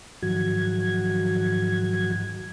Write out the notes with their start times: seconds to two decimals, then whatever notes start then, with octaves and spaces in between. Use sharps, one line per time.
0.22 G#2 D#3 F3 F#3 F#4 G#6